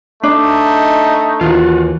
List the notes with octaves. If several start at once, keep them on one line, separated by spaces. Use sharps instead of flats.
A3 D4 D#4
D#2 E3 F4 F#4